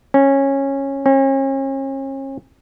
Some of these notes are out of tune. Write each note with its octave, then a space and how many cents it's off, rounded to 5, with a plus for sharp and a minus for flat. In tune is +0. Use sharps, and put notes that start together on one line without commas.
C#4 -15
C#4 -40